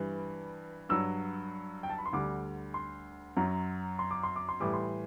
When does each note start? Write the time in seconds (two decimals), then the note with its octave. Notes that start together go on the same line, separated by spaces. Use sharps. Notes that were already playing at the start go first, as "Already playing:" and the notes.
Already playing: G2 E3 G3
0.89 G2 F#3 E6
1.83 G5
1.90 A5
1.98 B5
2.06 C6
2.13 D2 D3 G3 D6
2.74 C6
3.37 F#2 F#3
3.99 C6
4.11 D6
4.23 C6
4.36 D6
4.49 C6
4.60 A2 E3 G3 D6
4.74 C6